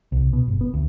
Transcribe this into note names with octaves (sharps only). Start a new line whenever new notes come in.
C2
B2
G1
B3
D2